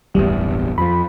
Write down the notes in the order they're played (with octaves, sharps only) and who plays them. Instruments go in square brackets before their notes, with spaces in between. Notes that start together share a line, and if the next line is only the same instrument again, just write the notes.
[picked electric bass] D1 G1 E2 [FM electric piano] G3
[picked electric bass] F2 F3 [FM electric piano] B5